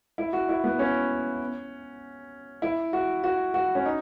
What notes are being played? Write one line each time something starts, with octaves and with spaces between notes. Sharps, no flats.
E4
F#4
E4
B3
C#4
E4
F#4
F#4
F#4
C#4
D#4